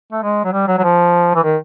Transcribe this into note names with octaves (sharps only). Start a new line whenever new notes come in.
A3
G#3
F#3
G3
F#3
F#3
F3
E3
D#3